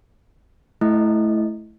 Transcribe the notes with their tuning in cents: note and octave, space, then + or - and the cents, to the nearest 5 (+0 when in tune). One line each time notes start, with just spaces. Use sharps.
A3 -20 E4 +0 D#5 +0